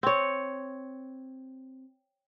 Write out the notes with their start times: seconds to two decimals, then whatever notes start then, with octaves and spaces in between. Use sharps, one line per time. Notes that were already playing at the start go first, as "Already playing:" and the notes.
0.03 C4 C#5